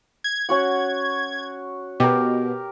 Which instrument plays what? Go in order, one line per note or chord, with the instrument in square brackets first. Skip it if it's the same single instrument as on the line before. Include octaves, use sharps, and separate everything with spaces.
[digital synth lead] G#6
[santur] C#4 F#4 F#5
[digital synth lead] B2 [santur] G4 A#4